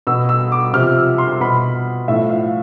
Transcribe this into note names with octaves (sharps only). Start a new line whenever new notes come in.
B2 E6
E6
D6
C3 F3 F6
E6
C6
B2 B5
A2 F3 E5
F5